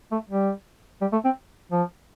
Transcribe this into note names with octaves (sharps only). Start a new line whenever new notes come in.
A3
G3
G3
A3
C4
F3